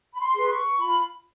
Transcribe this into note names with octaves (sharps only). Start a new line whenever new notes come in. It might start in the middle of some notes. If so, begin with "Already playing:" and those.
B5
C6
G#4 B4
C#6
F4 B5